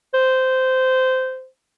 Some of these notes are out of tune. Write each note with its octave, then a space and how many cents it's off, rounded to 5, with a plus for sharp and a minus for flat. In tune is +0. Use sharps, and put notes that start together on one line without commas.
C5 -15